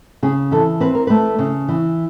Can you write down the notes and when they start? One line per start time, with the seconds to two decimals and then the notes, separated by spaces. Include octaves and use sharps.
0.23 C#3 G#4
0.51 E3 A4
0.80 C4 B4
0.95 A#4
1.07 A3 B4
1.39 C#3
1.68 E3